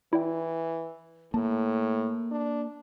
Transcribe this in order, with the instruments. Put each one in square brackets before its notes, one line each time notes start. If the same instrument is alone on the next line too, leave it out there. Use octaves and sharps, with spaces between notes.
[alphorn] E3 [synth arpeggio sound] E4 D5 G5
[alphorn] A2 [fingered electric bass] A#3 [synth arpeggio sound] A5
[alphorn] D4